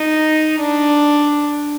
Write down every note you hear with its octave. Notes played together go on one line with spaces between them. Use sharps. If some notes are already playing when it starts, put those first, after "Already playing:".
Already playing: D#4
D4